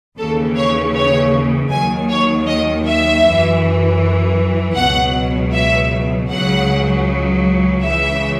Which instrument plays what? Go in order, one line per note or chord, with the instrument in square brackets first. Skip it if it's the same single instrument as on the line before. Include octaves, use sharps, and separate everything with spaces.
[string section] D#2 C#3 E3 A4
C#5
C#5
D#2 D#3 F#3 G#5
C#5
D#5
E5
F#2 E3
C#2 B2 F#3 F#5
E5
C#2 C#3 F#3 F#5
C#2 C#3 E3 E5